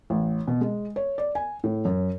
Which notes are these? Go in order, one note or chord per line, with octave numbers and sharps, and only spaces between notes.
A1
B2
G#3
C#5
D5
G#5
A2
F#2